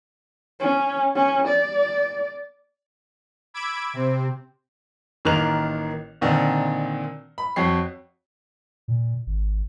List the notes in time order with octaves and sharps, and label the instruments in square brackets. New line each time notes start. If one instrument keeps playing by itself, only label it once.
[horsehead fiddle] C#4
C#4
D5
[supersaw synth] B5 D6 E6 G#6 D7
C3 C4
[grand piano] A1 D#3 A#3 A#4 F#6 F7
A#2 D3 D#3 C4
B5
F2 F#4 C#5 G5 C7
[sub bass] A#2
G#1